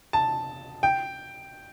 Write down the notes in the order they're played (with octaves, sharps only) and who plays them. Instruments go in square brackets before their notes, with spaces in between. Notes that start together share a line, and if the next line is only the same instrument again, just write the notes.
[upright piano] A5
G5